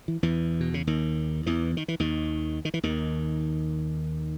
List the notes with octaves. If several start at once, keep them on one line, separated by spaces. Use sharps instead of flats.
E3
E2 E3
B2
C#3
D#2 D#3
E2 E3
D#3
E3
D#2 D#3
D#3
E3
D#2 D#3